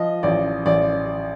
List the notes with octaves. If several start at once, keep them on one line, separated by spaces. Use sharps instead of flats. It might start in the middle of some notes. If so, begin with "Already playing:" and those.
Already playing: F3 D#5
A1 D5
A1 D5